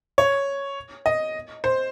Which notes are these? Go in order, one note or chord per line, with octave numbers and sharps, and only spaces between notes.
C#5
D#5
C5